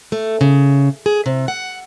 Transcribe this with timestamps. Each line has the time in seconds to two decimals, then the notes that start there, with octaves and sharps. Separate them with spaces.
0.12 A3
0.41 C#3
1.06 G#4
1.26 C3
1.48 F#5